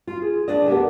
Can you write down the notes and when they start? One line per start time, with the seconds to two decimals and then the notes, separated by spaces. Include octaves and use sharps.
0.07 F4
0.22 G#4
0.48 D2 A3 D4 D5 D#5
0.68 A3 B3 G4 A#4 F#5